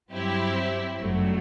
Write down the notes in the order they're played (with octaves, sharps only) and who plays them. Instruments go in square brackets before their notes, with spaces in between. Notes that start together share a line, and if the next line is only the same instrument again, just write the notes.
[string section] G2 F#3 C4 E4 G4
G1 F#2 F#3 A3